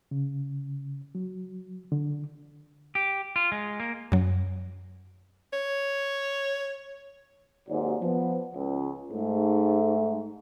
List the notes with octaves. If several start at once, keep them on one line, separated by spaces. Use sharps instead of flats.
C#3
F#3
D3
G4
F4
G#3
A#3
F#2 F#3
C#5
G#1 D#2 G#2 C3 F#3 D5
F3 B3
C#2
G#2 A3